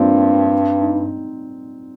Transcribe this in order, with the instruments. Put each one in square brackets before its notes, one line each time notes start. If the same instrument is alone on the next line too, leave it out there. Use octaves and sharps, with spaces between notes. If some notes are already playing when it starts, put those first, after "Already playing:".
Already playing: [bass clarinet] G2 [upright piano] F3 G3 A#3 C4 D4
[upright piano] D#4